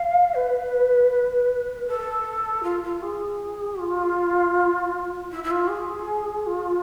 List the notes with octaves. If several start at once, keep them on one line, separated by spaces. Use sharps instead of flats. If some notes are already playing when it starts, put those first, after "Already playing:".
Already playing: F5
B4
A4
F4
F4
G#4
F4
E4
E4
F4
G#4
F4